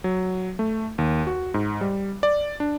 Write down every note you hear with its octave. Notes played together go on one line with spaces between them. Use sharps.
F#3
A3
D#2
F#4
G#2
G3
D5
D4